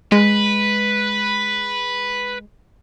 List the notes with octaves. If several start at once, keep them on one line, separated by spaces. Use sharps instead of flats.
G#3 B4